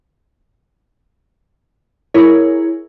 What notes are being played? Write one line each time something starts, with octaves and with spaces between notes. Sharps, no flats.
E4 G#4 A#4 C#5